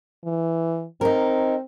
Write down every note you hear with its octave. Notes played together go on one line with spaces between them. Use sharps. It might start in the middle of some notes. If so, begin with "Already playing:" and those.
E3
C4 D#4 A#4